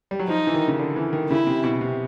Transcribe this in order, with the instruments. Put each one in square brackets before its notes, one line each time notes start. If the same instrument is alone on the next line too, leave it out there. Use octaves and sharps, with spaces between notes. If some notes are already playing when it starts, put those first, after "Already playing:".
[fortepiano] G3
F#3
[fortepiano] F3 [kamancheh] D#4
[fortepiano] E3
D#3
C#3
D3
E3
D#3
[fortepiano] C#3 [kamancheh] E4
[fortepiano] C3
B2
C3